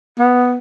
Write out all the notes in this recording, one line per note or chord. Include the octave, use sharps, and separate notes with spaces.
B3